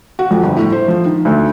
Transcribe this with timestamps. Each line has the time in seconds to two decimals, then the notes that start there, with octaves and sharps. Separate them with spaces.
0.19 F#4
0.31 F2
0.44 G1
0.56 A2
0.72 C5
0.88 F3
1.06 D#3
1.25 D2